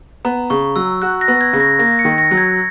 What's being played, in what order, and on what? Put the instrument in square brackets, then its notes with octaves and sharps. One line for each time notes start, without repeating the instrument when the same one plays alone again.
[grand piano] B3 [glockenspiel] A#5
[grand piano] C#3 [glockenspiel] C#6
[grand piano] F#3 [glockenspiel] E6
[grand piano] F#4 [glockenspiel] F#6
[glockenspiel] A#6
[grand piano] B3
[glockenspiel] G#6
[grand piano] C#3
[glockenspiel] A#6
[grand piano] A#3 [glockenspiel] A#6
[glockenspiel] C#7
[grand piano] D#3
[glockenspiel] A#6
[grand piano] F#3
[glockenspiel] G#6